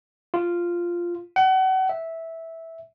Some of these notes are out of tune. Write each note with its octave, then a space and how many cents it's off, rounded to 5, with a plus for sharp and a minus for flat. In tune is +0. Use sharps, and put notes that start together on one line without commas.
F4 -5
F#5 +35
E5 -10